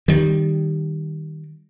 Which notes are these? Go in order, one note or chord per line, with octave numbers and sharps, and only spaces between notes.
D#3 G3